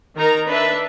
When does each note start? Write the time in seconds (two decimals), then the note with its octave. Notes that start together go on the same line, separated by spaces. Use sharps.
0.15 D#3 D#4 A#4 A#5
0.47 D4 B4 E5